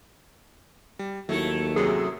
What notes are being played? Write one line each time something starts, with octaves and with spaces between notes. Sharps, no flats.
G3
D#2 F#3 A3 E4 A4
F#2 C3 F#3 G#4